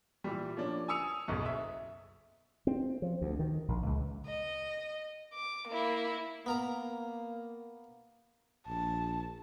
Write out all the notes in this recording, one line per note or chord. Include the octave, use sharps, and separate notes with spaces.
A#2 E3 G3
F3 A#3 C#4 D4
G#5 D#6 E6 C#7 F7
F#1 B1 F#2
E5
C4
F3
D2
D#3
A#1
C#2
D#5
D6
A#3 E4
A#3 B3 A#4 A#5
A#1 A5